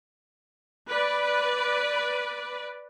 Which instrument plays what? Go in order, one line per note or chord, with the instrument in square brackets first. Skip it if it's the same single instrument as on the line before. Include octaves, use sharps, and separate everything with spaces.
[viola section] B4 D5